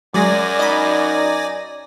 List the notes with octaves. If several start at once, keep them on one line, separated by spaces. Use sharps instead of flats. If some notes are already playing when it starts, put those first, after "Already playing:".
F#2 F#3 G#3 D5 G#5 A#6
D#4 D#5 B5